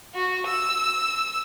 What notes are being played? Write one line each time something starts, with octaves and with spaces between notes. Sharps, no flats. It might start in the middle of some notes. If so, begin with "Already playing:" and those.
F#4
E6